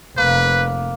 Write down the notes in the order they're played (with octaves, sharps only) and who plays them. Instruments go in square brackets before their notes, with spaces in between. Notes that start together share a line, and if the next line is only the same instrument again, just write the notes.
[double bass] F1 [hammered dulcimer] A#3 [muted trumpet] B4